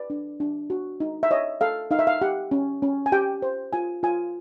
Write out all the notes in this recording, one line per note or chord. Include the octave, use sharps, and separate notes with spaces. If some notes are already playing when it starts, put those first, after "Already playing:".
Already playing: B4 D5
D4
D4
F#4
D#4
E5
C#5 D#5
A4 F5
D#4 F5
E5
F5
G4 F#5
C#4
C#4
G#5
G4 G5
C5
F4 G#5
F4 G#5